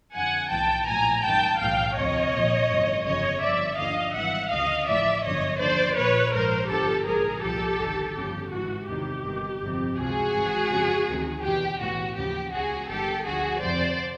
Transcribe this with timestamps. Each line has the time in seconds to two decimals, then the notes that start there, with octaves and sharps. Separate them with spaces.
0.14 F2 D3 F3 F#5 G#5
0.50 B1 A2 E3 G5 A5
0.87 A#1 A2 F3 G#5 A#5
1.23 G#1 F#2 D#3 G5 A5
1.60 B1 A2 E3 F5 G5
1.96 D2 C3 F3 C#5 D#5
2.33 A#1 A#2 F3
2.70 G#1 F#2 C#3 E3
3.05 G1 F2 C#3 F3 C#5 D#5
3.42 G1 G2 D3 F3 D5 E5
3.78 D#2 D3 F3 D#5 F5
4.14 G#1 G2 E3 E5 F#5
4.51 D2 C#3 F3 D#5 F5
4.87 A1 A2 F3 D5 E5
5.24 G1 F#2 D3 F3 C#5 D#5
5.60 D#2 D3 F3 C5 D5
5.97 A#1 A#2 F3 B4 C#5
6.34 A#1 G#2 F3 A#4 C5
6.70 G1 G2 D3 F3 G4 A4
7.06 A#1 G#2 F3 G#4 A#4
7.42 C2 A#2 F3 G4 A4
7.79 G1 G2 D#3
8.15 G1 F2 C#3 F3 G4
8.52 G#1 G#2 E3 F#4
8.88 E2 C3 D#3 G4
9.24 G1 G2 D#3
9.61 G1 F2 C3
9.97 C#2 C3 F3 F#4 G#4
10.34 G#1 G#2 E3
10.71 F2 C#3 F3
11.07 D2 C3 D#3
11.43 E2 B2 G4
11.80 B1 A2 E3 F#4
12.16 D#2 C#3 F3 G4
12.53 C#2 C#3 F3 F#4 G#4
12.89 G1 G2 D#3 G4 A4
13.25 D2 D3 F3 F#4 G#4
13.62 F2 C3 F3 C5 D5